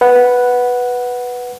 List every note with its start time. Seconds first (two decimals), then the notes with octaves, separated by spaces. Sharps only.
0.01 B4 F#5